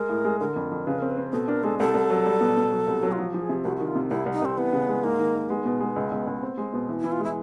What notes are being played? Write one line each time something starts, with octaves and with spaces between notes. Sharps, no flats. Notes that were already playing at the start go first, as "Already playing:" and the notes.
Already playing: G#3 A#4
A2
G#3
D3 A#4
F2
F2
C#3 B4
C4 A#4
B4
C4
B2 A4
D4 A#4
G#3 A4
C2 A4
C2
F#3
G3
B2
B2
F#3
C2
F#3
F4
F3 F#4
F3 G4
G#4
C3
C2 F#4
D#3 F#4
F4
C3
C2 E4
C2
D#4
C2 C4
E3 B3
C#3
G#3
G#2 A#3
D#3
D#3
G#3 B3
B2
G#3
C#2
C#2
C#2
C4
G#3
B2
E3
E3 E4
F4
G#3 E4